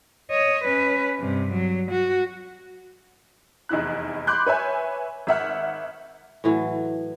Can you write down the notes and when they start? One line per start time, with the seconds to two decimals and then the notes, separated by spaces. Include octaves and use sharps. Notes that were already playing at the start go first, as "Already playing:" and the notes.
0.31 C#5 D#5
0.64 C#4 B4
1.20 G2 C3
1.52 F#3
1.91 F#4
3.69 F1 E2 D#4 E4 F#6
4.27 B5 C6 D6 F#6 G6
4.47 B4 C#5 E5 G#5
5.27 G#1 E5 F#5 F6
6.44 A2 E3 F#3